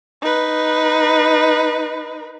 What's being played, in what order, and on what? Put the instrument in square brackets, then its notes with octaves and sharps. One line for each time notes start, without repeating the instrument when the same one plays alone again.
[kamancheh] D#4 B4